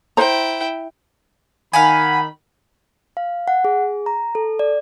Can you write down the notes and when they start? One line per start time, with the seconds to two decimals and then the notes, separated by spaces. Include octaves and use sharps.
0.17 E4 C5 G5 A#5
1.73 D#3 F5 F#5 G#5 B5
3.17 F5
3.48 F#5
3.65 G#4
4.06 A#5
4.35 A4
4.59 D5